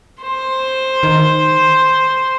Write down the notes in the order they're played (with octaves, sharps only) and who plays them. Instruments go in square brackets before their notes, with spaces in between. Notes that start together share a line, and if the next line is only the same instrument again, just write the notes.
[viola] C5
[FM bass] D#3